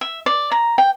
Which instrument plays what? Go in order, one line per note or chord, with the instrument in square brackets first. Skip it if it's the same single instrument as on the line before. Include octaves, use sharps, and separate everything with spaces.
[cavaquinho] E5
D5
A#5
G5